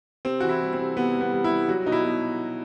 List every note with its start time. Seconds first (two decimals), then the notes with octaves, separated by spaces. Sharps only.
0.25 C3 C4
0.40 E3 F#4
0.49 E4
0.61 G3
0.73 C4
0.79 C3
0.97 C3 B3
1.15 G3
1.21 B3
1.32 G3
1.44 E4
1.51 G3
1.69 F#3 F#4
1.86 B2 D#4
1.92 E4
2.04 B2